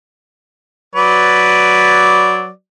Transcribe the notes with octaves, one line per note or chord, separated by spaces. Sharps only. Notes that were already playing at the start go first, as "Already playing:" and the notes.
F#3 B4 D5